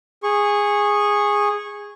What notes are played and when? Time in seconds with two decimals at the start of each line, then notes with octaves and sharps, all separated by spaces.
0.23 G#4 C#6